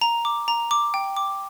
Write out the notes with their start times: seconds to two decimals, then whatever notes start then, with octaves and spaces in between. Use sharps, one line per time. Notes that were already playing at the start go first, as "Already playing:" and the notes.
0.01 A#5
0.25 D6
0.48 A#5
0.71 D6
0.94 G5
1.16 D6